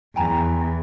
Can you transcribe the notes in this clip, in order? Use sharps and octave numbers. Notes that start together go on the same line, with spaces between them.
E2 G5 G#5 A#5